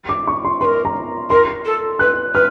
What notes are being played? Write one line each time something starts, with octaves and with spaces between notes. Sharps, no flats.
D6
C#6
C6
B4 C6
A#4
A#5
A#4 C6
A4
B4 F#6
B4 F6